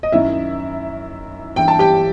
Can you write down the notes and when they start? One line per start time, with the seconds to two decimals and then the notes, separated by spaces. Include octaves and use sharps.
0.03 D#5
0.12 F#2 D#3 E4 E5
1.56 G2 E3 G5
1.68 A5
1.79 G4 G5